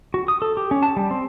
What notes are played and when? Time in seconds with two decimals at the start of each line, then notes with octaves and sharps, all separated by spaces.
0.14 F#4
0.28 D#6
0.42 A4
0.57 G4
0.71 C#4
0.83 A5
0.96 G3
1.11 C4